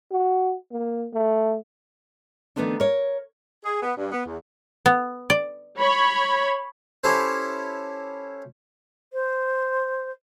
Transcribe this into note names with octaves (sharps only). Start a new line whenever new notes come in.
F#4
A#3
A3
D#3 F3 A3 B3 C4 D4
A#4 C#5
G#4
B3
G2
B3
E2
B3
D5
C#5 B5
C#4 E4 G4 A4 C5
C5